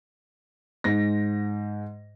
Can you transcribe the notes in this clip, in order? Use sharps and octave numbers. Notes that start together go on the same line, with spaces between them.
G#2 A#6